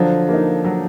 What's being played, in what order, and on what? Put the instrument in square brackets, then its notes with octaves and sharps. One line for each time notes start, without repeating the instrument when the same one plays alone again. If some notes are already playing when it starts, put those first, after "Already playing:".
Already playing: [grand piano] D3 F3 [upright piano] F#3
[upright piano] A#3 D#4
F#3